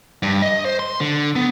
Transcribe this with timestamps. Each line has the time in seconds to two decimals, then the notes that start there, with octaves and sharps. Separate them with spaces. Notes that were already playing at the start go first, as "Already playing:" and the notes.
0.23 G2
0.42 D#5
0.65 C5
0.79 C6
1.01 D3
1.36 B3